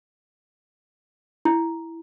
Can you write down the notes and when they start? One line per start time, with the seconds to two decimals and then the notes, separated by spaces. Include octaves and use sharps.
1.45 E4